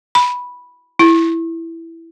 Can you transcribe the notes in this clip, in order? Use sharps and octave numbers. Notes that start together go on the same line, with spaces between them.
B5
E4